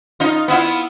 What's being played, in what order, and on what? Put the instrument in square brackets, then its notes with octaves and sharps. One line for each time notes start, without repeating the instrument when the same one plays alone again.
[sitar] D#4 F4
B3 E4 F4